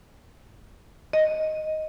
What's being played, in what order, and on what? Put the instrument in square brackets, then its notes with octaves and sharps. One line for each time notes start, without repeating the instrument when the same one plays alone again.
[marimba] D#5